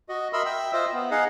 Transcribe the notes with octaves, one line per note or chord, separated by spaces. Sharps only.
F#4 D#5
A#4 D#5 E5 B5 C6 E6
E5 G5 E6
F4 C5 D#5 E5
B3
D#4 G#4 D#5 F5 F#5